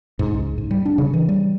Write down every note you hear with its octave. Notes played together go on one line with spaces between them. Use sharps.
G#2
C#2
G#2
G3
D4
C#3
E3
G3